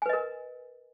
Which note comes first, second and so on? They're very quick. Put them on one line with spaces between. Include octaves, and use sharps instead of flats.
G#5 B4 D#5 A#4